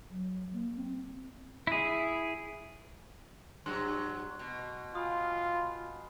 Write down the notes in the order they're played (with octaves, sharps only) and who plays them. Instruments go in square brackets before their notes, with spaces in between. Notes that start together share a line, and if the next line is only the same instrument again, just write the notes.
[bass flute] F#3
A#3
C4
[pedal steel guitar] E4 G#4
[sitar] G2 F#3 [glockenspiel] C6 F#6
[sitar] B2
[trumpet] F4 [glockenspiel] G#5 B5 D#6
[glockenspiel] B5